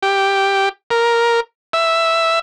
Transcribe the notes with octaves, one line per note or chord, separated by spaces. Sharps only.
G4
A#4
E5